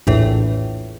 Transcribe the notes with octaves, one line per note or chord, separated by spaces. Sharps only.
A#1 E2 A2